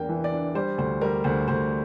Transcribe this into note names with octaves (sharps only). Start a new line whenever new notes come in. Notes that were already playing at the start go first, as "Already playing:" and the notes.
Already playing: E2 A#3 D4 G5
E3
D5
D4
G3 C5
D2 C5
G3 A#4
D2 C5
D2 C5